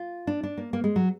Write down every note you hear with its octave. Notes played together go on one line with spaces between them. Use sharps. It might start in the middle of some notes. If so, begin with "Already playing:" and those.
Already playing: F4
D4
D4
A#3
A#3
G#3
F#3